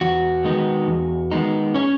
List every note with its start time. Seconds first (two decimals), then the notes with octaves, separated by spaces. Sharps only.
0.01 E2 F#4
0.44 D#3 G#3 B3 D#4
0.88 E2
1.31 D#3 G#3 B3 D#4
1.74 C#4 C#5